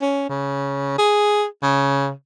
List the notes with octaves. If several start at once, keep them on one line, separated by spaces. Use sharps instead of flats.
C#4
C#3
G#4
C#3